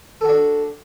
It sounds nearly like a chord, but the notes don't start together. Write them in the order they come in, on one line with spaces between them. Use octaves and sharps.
A4 F#4 D4